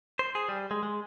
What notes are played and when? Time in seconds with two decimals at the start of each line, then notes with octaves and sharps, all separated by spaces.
0.19 C5
0.35 G#4
0.49 G3
0.71 G#3
0.83 G#3